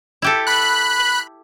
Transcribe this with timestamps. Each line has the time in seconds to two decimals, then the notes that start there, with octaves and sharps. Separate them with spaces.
0.22 E4 G4 A4
0.47 B5 F#6